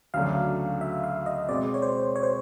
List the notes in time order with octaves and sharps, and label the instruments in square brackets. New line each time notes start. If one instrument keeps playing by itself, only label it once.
[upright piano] D2 C#3 F#3 A3 D4 [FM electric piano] F5
[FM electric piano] E5
F5
D#5
[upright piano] B2 G#3 C4 [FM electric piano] D5
[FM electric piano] C#5
C5
C#5
C5